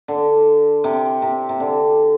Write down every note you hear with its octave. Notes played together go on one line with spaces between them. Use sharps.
D3
C3
C3
C3
D3